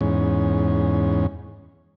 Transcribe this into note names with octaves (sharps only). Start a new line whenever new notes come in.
E2 G#2 C#4